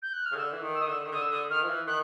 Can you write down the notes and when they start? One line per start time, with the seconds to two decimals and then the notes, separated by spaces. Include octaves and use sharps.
0.02 G6
0.13 F#6
0.26 F6
0.32 C#3
0.37 D3 E6
0.53 E3
0.62 D#3
0.74 E6
0.81 D#3 D#6
0.87 D3 E6
1.05 D#3
1.12 D3 D#6
1.22 E6
1.31 D3 D#6
1.50 D#3 F6
1.63 F3
1.68 E3
1.87 D#3 F#6